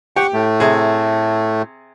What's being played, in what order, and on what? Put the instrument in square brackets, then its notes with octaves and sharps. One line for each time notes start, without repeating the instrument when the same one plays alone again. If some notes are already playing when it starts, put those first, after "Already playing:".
[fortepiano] G4 [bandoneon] F#5 C#6
[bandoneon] A2 A3
[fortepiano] C3 G#4